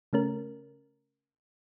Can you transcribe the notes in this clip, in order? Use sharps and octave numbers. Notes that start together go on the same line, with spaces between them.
C#3 A3 C#4 A#4